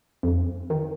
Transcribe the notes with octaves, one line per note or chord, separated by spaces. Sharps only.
F2
D#3